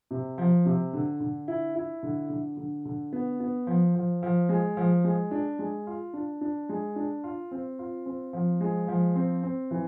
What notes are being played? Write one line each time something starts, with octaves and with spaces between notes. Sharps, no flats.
C3
F3
C3
D3
D3
E4
E4
D3
D3
D3
D3
B3
B3
F3
F3
F3
G#3
F3
G#3
D4
G#3
F4
D4
D4
G#3
D4
F4
C4
F4
C4
F3
G#3
F3
C4
C4
E3